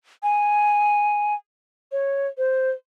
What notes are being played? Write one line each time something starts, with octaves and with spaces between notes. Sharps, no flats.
G#5
C#5
C5